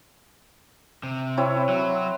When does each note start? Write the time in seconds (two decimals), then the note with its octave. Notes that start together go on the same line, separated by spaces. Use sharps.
1.03 C3
1.37 C4 E4 C#5
1.69 F#3